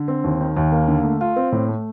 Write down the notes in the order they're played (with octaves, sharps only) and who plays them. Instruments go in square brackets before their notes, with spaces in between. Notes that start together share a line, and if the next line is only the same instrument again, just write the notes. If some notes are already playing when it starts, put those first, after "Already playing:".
Already playing: [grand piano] D3
C4
D#2
D#3
D#2
A#3
D3
A3
F4
C4
A2
A3